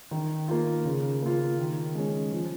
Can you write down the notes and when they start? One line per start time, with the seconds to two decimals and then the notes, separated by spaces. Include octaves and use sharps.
0.11 D#3
0.48 A#3 F4
0.85 C#3
1.22 A#3 F4
1.59 D#3
1.95 G#3 C#4
2.32 F3